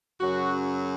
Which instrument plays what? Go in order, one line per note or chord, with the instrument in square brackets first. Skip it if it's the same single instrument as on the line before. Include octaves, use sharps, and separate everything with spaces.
[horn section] F#2 C#3 F#3 F#4